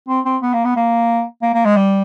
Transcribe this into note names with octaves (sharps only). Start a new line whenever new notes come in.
C4
C4
B3
A#3
B3
A#3
A#3
A#3
G#3
G3